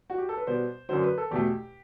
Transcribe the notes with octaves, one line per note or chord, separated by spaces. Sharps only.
F#4
G4
A4
B4
B2 G3 B3 C5
F#2 D3 F#3 C5
B4
A4
E2 B2 A3 G4